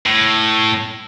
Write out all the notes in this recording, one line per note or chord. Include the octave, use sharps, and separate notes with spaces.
A2